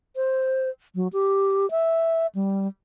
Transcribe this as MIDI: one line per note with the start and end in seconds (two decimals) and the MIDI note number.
0.16 0.70 72
0.95 1.08 54
1.13 1.69 67
1.71 2.27 76
2.35 2.67 55